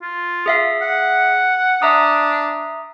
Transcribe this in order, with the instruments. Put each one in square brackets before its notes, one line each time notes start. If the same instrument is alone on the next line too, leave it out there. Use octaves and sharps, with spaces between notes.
[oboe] F4
[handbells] G#4 E5 F5
[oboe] F#5
[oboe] D4 [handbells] E5 A#5 D#6